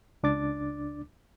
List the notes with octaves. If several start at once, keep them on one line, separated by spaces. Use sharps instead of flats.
C#2 D4 D6 A6